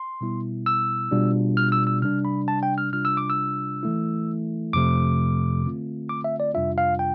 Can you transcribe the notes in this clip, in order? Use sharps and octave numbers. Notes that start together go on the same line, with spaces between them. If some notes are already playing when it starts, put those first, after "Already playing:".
Already playing: C6
B2 G3 B3 E4
E6
B2 G3 D4 F4
F6
E6
E6
C3 G3 D4 F6
B5
A5
G5
F6
C3 G3 D4 F4 F6
E6
D6
E6
E3 A3 E4
F2 C3 F3 A3 D6
D3 A3 C4 F4
D6
E5
D5
F2 C3 G3 D4 F4 E5
F5
G5